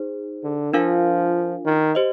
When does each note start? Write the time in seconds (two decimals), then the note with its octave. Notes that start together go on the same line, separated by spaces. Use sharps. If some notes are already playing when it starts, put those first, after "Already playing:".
Already playing: D#4 G#4 C5
0.44 D3
0.73 F3 D4 F4 A#4 F5 G#5
1.65 D#3
1.95 G4 C5 D#5